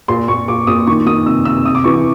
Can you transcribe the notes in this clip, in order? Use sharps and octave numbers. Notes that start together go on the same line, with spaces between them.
A#2 C6
A#2 C#6
A#2 D6
A#2 D#6
D#3 C#6
D#3 D#6
C3 E6
C3 E6
C3 D#6
D6
E3 C#6
D6